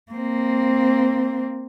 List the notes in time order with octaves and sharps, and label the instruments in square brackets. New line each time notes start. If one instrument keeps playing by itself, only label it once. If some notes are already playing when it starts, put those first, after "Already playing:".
[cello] A#3 C4